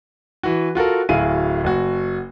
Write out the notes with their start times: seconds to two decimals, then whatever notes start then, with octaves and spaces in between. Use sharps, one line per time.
0.43 E3 F#4
0.75 F4 F#4 A4 A#4
1.09 D1 E4 F#4 G#4 F5 D#7
1.64 F#1 F#4